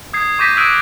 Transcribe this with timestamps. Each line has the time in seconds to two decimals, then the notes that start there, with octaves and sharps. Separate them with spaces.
0.13 D#6 G#6 C7
0.39 C#6 D6 G6 A#6 B6 D#7
0.57 D#6 E6 F#6 G#6 D7 D#7